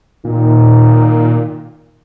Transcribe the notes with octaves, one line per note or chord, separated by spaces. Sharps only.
A#2 D#3